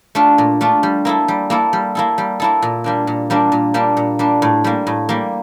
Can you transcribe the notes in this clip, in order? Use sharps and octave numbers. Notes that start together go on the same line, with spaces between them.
A3 D4 F4
A#2
A3 D4 F4
G3
A#3 E4 A4
G3
A#3 E4 A4
G3
A#3 E4 A4
G3
A#3 E4 A4
A#2
G3 A#3 D4
A#2
G3 A#3 D4
A#2
G3 A#3 D4
A#2
G3 A#3 D4
A2
G3 A#3
A2
G3 A#3